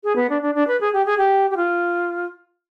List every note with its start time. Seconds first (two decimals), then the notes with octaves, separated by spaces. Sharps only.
0.04 G#4
0.16 B3
0.30 D4
0.42 D4
0.55 D4
0.67 B4
0.81 G#4
0.93 G4
1.06 G#4
1.18 G4
1.51 G4
1.57 F4